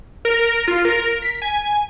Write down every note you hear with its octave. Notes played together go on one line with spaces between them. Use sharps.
A#4
F4
A#4
B6
G#5